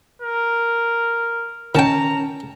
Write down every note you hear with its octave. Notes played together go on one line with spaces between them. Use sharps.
A#4
D#3 C#4 G5 A5 A#5